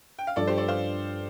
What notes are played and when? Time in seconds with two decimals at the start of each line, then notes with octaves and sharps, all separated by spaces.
0.19 G5
0.27 F5
0.36 G2 F3 D4 A4 D5
0.47 G4 C5
0.58 A4 D5
0.68 C5 F5